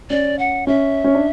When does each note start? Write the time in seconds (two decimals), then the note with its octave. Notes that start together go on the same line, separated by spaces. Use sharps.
0.10 C#4 D5
0.39 F#5
0.67 C#4 E5
1.04 C#4
1.15 D4